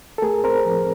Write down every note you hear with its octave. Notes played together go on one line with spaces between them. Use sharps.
A4
A3 G#4 A#4
C4 A#4 C5
F3